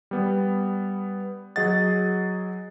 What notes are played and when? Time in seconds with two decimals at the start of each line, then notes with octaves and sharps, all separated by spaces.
0.11 G3 B3
1.56 F#3 G#4 D#5 F#5 A6